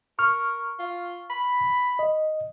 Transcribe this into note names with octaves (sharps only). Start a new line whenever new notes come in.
A#4 C#6 F6
F4
B5
D#5